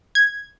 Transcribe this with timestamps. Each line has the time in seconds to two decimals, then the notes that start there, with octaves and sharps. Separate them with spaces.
0.15 G#6